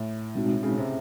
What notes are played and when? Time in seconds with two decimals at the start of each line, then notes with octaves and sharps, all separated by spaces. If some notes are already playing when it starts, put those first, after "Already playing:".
Already playing: A2
0.35 B2 G#3 C4 D#4 F#4
0.63 C#3
0.78 C3